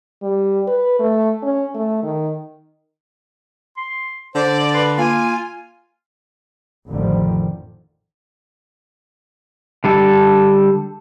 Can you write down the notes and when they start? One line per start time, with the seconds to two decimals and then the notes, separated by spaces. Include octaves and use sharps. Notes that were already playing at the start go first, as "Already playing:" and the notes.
0.22 G3
0.68 B4
1.00 A3
1.42 C#4
1.75 A3
2.03 D#3
3.77 C6
4.35 D3 C5 D5
4.74 B4 C6
4.98 A#3 F4 G#5
6.88 A1 F2 D3 D#3 F3 G3
9.84 D3 G3 A4